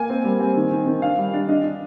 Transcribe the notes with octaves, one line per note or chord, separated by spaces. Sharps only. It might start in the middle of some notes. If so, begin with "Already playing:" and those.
Already playing: A#3 G#5
C4
G3
C4
D#3
D#3
D#3
D4 F5
G3
D4
D4 D#5
D4